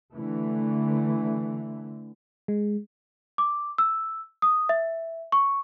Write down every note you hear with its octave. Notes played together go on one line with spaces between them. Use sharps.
D3 E3 A3
G#3
D6
E6
D#6
E5
C#6